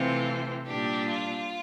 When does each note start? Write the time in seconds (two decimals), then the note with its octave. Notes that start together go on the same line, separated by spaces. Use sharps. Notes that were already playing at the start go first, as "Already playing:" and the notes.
Already playing: C3 E3 A3 C4 F4
0.68 A#2 G3 D4 G4
1.09 F4